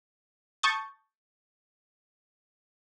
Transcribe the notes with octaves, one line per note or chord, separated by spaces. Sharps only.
A5 C#6 D#6 G6 A6